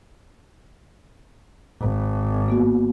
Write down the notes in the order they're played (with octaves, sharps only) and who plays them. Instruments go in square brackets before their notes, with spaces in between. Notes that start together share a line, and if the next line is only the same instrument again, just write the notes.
[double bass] G#1
[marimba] A#3 B3 F#4